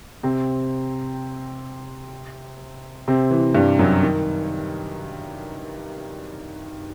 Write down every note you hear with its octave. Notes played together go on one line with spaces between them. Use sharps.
C3 C4
C3 C4
E3
G2 G3
F#2 F#3
D#3